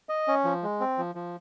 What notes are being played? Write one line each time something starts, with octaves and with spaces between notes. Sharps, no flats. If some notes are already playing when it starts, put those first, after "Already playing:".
D#5
C#4
F3
G#3
C4
F3
F3